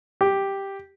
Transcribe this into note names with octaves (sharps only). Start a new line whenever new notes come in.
G4